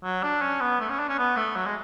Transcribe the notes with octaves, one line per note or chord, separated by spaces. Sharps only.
F#3
D4
C#4
B3
A3
C#4
D4
C#4
B3
A3
F#3
G#3